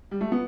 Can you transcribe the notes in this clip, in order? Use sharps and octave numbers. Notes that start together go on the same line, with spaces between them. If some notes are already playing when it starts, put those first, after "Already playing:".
G3
A3
B3